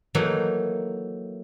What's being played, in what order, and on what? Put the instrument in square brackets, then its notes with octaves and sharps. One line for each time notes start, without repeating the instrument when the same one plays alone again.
[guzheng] E3 F#3 A3 A#3 D#4